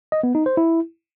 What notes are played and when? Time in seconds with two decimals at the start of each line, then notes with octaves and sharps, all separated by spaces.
0.12 D#5
0.23 B3
0.35 D#4
0.46 C5
0.57 E4